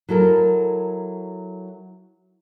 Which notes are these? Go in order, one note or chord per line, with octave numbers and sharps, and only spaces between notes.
F#3 E4 A4 A#4